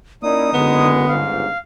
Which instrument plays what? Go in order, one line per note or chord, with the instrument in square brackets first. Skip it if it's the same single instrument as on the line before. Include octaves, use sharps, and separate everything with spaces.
[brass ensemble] A#3 C#4 E4 [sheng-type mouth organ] D#4 D#6 [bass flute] D5
[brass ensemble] F#1 G#3 [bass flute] D3 [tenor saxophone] B3
[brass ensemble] G1 C#2 G#2 [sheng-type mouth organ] F5